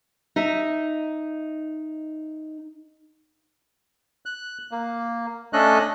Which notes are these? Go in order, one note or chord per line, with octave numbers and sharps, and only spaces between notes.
D#4 D#5 E5
F#6
A#3
A3 C#4 D4 A4 D#5 F#6